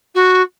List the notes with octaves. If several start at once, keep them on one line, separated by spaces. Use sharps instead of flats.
F#4